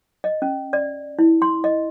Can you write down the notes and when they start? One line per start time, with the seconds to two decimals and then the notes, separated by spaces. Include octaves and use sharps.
0.24 D#5
0.42 C#4
0.73 D5
1.19 E4
1.42 C6
1.64 D#5